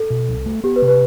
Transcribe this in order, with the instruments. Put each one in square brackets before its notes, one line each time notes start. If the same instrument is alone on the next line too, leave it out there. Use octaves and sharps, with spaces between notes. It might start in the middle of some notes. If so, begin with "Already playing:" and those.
Already playing: [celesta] A4
[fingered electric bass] B2
C2
A3
[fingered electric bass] B3 [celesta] G4
[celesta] B4
[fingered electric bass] C3
[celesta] B4